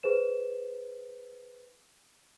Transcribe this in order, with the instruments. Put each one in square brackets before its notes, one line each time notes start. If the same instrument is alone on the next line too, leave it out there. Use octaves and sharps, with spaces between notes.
[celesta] G#4 B4 C5 E7